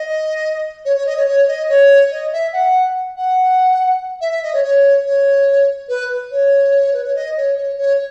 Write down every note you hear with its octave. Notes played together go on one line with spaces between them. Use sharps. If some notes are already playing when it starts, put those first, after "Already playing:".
Already playing: D#5
C#5
C#5
D#5
C#5
C#5
D#5
C#5
D#5
E5
F#5
F#5
E5
E5
D#5
C#5
C#5
C#5
B4
C#5
B4
C#5
D#5
C#5
C#5
C#5